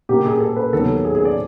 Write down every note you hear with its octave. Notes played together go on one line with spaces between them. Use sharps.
A#2 G3 A#3 D4 G4
G#4
A4
B4
D#2 D#3 F#3 B3 D4 A4
G#4
G#4
D5